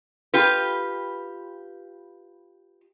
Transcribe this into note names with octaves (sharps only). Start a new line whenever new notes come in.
F4 G4 B4